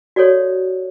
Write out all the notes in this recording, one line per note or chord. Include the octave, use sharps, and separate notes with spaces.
F#4 A4 C#5 D5